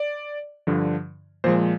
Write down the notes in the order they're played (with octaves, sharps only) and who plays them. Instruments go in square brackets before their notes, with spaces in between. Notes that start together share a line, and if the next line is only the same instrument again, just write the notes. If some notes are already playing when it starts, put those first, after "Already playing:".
Already playing: [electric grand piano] D5
G2 D3 F3
A#2 F3 G#3 C5